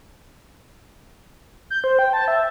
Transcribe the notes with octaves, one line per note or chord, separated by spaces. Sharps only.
G6
C5
G5
A5
E5